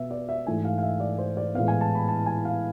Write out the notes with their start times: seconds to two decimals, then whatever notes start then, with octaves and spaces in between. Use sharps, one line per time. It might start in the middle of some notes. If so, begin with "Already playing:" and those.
Already playing: B2 B3 E5
0.11 D5
0.29 E5
0.47 G#2 E3 A3 G#5
0.65 F5
0.78 F5
0.82 E5
1.00 D5
1.18 C5
1.37 D5
1.55 A2 E3 G#3 B3 F5
1.68 G#5
1.81 A5
1.95 B5
2.08 A5
2.26 G#5
2.45 F5